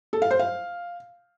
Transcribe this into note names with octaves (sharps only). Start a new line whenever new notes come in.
A4
F5
C5
F5